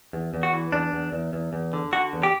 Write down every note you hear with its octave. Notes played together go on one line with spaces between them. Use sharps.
E2
E2
F#4
E3
E2 D4
E2
E2
E2
E2
D3
D3 F#4
E2
G4